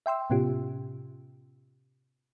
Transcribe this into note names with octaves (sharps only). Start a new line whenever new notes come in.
E5 G5 C6 E6
A2 C3 B3 C#4 F4 G4